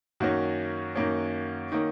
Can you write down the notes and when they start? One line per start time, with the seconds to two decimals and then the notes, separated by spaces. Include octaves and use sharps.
0.20 F#2 D#3 A#3 C#4 F#4
0.95 F#2 D#3 A#3 C#4
1.72 D#3 A#3 C#4